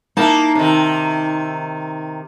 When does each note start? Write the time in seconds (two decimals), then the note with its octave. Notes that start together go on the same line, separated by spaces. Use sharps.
0.17 A#3 D#4 E4 A5
0.55 C3 D#3